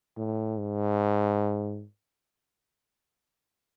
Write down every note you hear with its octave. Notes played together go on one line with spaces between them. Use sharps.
A2
G#2